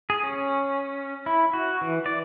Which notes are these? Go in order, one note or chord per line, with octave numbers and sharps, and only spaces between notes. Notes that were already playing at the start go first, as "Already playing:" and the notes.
G#4
C#4
E4
F#4
E3
D5